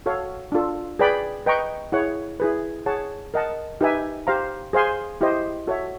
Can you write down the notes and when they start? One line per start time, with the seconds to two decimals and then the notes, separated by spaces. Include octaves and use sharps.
0.06 F#4 A4 C#5 F5
0.52 D4 F4 A4
0.99 G#4 B4 D5 G5 B5
1.46 B4 D#5 G5 A#5 C#6
1.92 E4 G#4 C#5 F#5
2.40 E4 G#4 B4
2.86 G#4 C#5 F#5 A5
3.34 A#4 D#5 F#5 A5
3.81 D#4 G4 B4 E5 G#5
4.27 G4 C5 F5 A#5
4.73 G#4 C5 F5 G#5 C6
5.21 E4 G4 C5 D#5
5.67 F#4 A4 C#5 E5